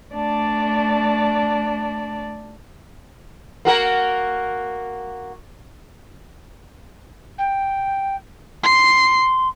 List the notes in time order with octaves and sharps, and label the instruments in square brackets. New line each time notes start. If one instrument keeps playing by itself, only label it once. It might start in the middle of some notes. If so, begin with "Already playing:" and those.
[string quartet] A3 D4 D5
[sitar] A#3 F#4 A#4
[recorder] G5
[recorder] C6 [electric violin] C7